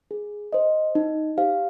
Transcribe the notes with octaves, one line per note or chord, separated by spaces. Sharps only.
G#4
C5 D#5
D#4
G4 C5 F5